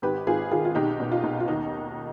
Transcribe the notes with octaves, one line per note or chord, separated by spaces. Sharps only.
G#1 G4 B4
G#1 F4 G#4
D#3 F4 G#4
F4
B1 D#4 G4
B2
F4
B1
F4
D#2 D#4